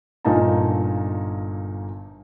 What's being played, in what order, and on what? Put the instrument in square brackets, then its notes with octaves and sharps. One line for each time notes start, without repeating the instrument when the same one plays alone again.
[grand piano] G1 A#2 A#3 D#4 G#5 A5